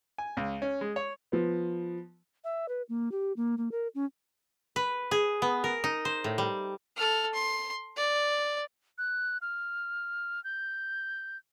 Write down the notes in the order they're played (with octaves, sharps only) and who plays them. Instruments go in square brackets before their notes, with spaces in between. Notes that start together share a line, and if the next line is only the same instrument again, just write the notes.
[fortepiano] G#5
C#2
C#4
G#3
C#5
[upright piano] F3 B3
[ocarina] E5
B4
A#3
G4
A#3
A#3
A#4
C#4
[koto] B4
G#4
B3
A#4
D#4
C5
A2
G3
[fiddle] A4 F6
C6
D5
[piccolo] F#6
F6
G6